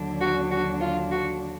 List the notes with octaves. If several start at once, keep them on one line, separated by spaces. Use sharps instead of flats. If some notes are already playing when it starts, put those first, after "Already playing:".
Already playing: D#2 D3 F#3 D4
F#4
F#4
F4
F#4